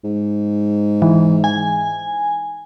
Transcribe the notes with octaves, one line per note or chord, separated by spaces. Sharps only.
G#2
E3
G#5